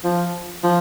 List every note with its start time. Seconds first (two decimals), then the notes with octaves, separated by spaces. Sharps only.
0.04 F3
0.63 F3